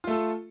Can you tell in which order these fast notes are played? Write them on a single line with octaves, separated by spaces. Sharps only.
F4 A3 A4